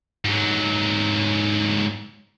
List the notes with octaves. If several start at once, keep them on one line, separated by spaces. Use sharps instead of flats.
G#2 F#3